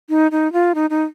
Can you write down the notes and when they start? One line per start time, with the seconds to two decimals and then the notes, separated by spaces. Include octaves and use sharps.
0.09 D#4
0.32 D#4
0.53 F4
0.75 D#4
0.90 D#4